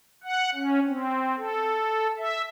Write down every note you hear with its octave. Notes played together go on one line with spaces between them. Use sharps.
F#5
C#4
C4
A4
E5